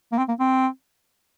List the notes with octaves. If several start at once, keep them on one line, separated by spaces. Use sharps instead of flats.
A#3
C4
A#3
C4